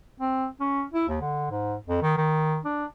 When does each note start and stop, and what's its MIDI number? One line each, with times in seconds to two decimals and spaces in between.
0.20 0.47 60
0.60 0.83 61
0.93 1.07 64
1.08 1.18 39
1.21 1.46 50
1.50 1.75 44
1.88 2.01 41
2.02 2.15 51
2.17 2.59 51
2.65 2.85 62